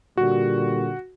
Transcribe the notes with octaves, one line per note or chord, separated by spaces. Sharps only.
A#2 D3 G3 F#4